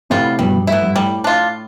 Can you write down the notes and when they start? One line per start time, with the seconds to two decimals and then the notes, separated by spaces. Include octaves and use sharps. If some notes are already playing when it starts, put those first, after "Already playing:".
0.10 A2 C3 G3 B3 F4
0.39 G2 B2 G3
0.54 G2
0.67 A2 B3 E4
0.82 G2
0.96 A2 G3
1.24 D4 F4